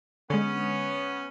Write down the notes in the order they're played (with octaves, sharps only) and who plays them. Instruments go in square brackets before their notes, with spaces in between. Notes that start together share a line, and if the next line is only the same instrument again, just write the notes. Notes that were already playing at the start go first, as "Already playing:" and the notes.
[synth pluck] D3 G#3 [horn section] B3 C#4